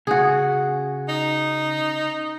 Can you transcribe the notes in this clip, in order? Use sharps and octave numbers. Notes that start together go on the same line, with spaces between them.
C#3 F#4 G#4
D#4